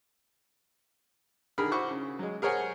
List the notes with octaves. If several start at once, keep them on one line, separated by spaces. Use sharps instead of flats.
D3 D#3 G#4 A#4 B5 F6
E4 F#4 C5 F#5 C#6 D6
C#3
F#3 G#3
G#4 A#4 C5 C#5 F#5 G#5